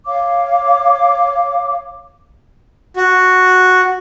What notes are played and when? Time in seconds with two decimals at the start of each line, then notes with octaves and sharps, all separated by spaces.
0.06 C#5 F5 D6
2.96 F#4